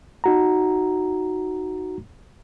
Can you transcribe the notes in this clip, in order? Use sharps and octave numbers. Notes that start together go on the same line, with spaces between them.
D#4 F#4 A#5